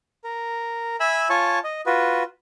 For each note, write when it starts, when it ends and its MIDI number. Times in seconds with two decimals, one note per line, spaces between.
0.24 0.96 70
1.00 1.29 76
1.00 1.29 80
1.00 1.29 83
1.00 1.29 88
1.30 1.59 65
1.30 1.59 73
1.30 1.59 80
1.30 1.59 81
1.30 1.59 85
1.64 1.81 75
1.86 2.23 65
1.86 2.23 66
1.86 2.23 71